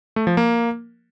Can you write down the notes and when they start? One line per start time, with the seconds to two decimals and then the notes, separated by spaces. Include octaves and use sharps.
0.16 A3
0.27 F3
0.37 A#3